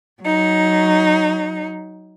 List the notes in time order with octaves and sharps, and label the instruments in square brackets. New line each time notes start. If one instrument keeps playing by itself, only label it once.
[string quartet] F#3 D#4